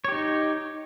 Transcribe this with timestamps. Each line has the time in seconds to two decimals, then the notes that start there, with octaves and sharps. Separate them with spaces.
0.05 C#5
0.08 G4
0.12 D#4